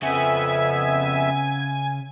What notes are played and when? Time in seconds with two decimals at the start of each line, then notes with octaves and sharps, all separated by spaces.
0.03 F2 C#3 B3 E5 G#5